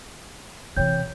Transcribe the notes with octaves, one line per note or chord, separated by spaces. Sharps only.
C3 E3 C#5 G5 G6